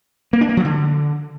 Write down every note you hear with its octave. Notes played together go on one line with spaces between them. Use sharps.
A#3
D4
A#3
F3
D3